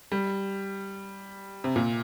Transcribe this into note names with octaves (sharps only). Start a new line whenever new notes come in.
G3
C3
A#2